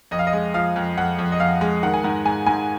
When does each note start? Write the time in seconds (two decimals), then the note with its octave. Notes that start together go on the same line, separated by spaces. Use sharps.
0.11 F2 D#5
0.19 F5
0.27 D#5
0.33 G#3
0.54 F3 F5
0.76 F2
0.97 F2 F#5
1.19 F2
1.32 D#5
1.40 F2 F5
1.61 G#3
1.83 D#3 F#5
1.94 G#5
2.04 G#2 F#5
2.25 G#2 G#5
2.46 G#2 G#5